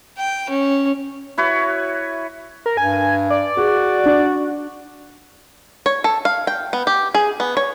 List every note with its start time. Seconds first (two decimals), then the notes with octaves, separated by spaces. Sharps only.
0.18 G5
0.49 C#4
1.38 E4 F#4 B4 C#5
2.66 A#4
2.77 G2 G#5
3.30 D5
3.57 F#4 G#4
4.06 D4
5.86 C#5
6.04 A4
6.25 F5
6.47 G5
6.73 B3
6.87 G4
7.14 G#4
7.40 B3
7.57 C#5